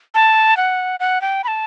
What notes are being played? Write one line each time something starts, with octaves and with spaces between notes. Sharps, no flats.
A5
F#5
F#5
G5
B5
A5